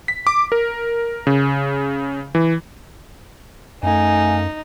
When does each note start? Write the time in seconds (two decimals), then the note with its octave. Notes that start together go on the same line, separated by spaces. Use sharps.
0.08 B6
0.27 D6
0.52 A#4
1.27 C#3
2.35 E3
3.83 F#2 A3 D#4 F5 G#5